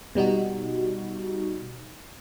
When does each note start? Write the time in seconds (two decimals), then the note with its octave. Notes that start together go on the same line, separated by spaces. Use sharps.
0.15 B2 G3 D#4 F#4